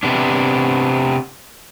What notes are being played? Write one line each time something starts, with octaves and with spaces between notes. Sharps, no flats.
C3 B3 D4